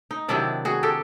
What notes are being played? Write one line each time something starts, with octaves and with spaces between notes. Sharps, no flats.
D#4
C3 D#3 F#3 D4 E4
F#4 G#4
G4 A4